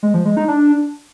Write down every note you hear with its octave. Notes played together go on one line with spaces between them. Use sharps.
G#3
F3
G#3
D#4
D4